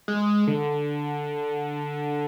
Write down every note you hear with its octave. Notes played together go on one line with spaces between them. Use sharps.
G#3
D3